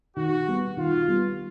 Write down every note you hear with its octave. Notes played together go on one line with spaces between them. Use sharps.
D#3 F#4
G3 B3
D#3 F4
G3 B3